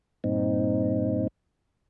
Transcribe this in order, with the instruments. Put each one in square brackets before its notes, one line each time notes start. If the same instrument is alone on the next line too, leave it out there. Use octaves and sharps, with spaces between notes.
[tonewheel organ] G2 A#2 C4 D#4